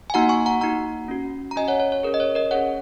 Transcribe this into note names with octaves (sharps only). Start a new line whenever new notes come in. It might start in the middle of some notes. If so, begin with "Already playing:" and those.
G#5
A#3 D#4 F#4 F#5 A#5
G#5 C#6
F#5 A#5
A#3 D#4 F#4 F#5 A#5
C#4 F#4
A#5
C#4 F#4 D#5 G#5
C#5 F#5
C#5
C#5
C#4 G#4 A#4
D#5
C#5
A#4 D#5
C#4 G#4 C#5 F#5